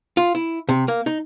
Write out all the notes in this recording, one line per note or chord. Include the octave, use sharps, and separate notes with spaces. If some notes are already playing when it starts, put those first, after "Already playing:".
F4
E4
C3
A#3
D#4